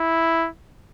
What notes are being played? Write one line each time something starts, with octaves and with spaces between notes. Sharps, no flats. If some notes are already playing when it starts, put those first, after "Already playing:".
Already playing: E4